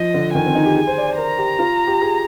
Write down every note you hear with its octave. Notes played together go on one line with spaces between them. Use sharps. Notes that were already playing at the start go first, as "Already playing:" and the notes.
Already playing: F3 D#5
D3
D#3 G#5
C4
D#4
G4
G#4
C5
D5
C5
A#4 A#5
G4
F4
G4
G#4